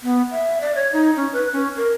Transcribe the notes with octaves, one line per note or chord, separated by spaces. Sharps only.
B3
E5
D5
C#5
D#4
C#4
B4
C#4
A#4